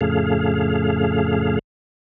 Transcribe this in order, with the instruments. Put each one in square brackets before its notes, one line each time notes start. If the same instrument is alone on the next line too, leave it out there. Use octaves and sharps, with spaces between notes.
[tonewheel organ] F2 A2 C#3 A3 G#4 F5